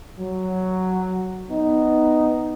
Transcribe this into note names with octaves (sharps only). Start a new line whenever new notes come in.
F#3
B3 D#4